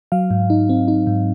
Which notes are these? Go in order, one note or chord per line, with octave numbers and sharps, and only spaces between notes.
F#3 F5
G#2
D#4
C4
D#4
G#2